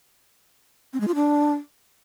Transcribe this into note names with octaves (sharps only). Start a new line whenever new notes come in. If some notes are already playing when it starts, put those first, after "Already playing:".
C4
G#3
F4
D4